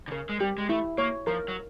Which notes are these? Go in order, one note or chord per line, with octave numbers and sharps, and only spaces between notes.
D3
C#3 A#4
G#3
G3 G4
G#3
A3 E4
A#3 C#5
F3 A#4
F#3